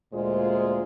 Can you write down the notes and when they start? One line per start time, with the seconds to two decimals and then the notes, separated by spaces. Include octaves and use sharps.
0.13 D2 A#2 G#3 F4 G#4 C5